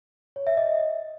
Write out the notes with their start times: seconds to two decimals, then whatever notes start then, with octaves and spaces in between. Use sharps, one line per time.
0.36 C#5
0.47 E5
0.57 D#5